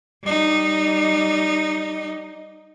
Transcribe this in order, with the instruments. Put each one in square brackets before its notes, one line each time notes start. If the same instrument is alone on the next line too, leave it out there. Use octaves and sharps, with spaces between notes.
[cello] G3 D#4